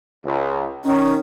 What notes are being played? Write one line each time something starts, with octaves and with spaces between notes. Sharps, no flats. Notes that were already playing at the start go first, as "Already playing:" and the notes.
C#2
D#3 C#4